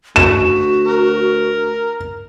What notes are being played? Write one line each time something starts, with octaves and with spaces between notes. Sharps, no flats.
D2 F#4 E7
A#4